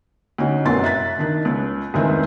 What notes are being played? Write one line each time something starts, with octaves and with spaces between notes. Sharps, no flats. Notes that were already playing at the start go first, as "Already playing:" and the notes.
D2 C#4 D#4 F#4
F1 C2 F#2 B2 C6 A6
E5 F#6 A6 B6
D#3 D4 D#4
C#2
F1 C#2 D#3 C4 E4 E5